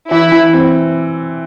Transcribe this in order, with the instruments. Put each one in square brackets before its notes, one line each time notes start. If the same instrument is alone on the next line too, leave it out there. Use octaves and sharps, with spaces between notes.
[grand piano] E3 [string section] E4
[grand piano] E3
C4